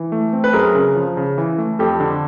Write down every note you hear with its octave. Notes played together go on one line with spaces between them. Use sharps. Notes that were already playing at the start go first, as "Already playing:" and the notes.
Already playing: E3
A3
C4
B4
F#2 G#4 A#4
C#3
F3
C#3
E3
A3
F2 G4 A4
D3